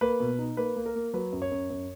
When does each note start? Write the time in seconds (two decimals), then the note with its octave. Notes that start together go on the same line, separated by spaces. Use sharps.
0.01 A#3 B4
0.20 B2
0.39 D#4
0.57 A#3 B4
0.76 A#3
0.86 A#4
0.95 A#3
1.14 F#3 B4
1.33 F#2
1.42 C#5
1.51 F#2
1.70 F#2